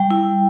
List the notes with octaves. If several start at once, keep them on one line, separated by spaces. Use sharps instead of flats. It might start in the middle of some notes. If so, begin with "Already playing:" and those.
Already playing: G3 G5
E4